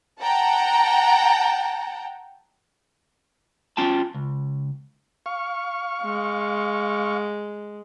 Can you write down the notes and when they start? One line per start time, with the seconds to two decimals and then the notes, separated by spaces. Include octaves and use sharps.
0.21 F#5 G5 A5 A#5
3.77 C#4 F4 G5 A5
4.14 C#2
5.26 F5 C#6
6.03 G#3